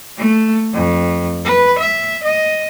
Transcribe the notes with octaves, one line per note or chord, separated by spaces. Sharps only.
A3
F2
B4
E5
D#5